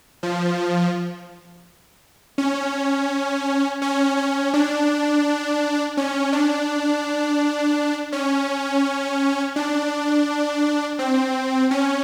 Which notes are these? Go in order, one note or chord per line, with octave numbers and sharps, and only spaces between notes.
F3
C#4
C#4
C#4
D4
C#4
D4
C#4
D4
C4
C#4